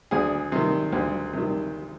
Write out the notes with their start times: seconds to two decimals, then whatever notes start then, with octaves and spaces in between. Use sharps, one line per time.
0.11 D2 G#4
0.52 C3 D#3
0.92 D2
1.33 C3 D#3